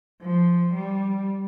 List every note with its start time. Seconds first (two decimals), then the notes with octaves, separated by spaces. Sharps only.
0.22 F3
0.74 G3